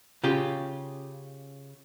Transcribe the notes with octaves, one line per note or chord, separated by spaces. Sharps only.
C#3 F4 G4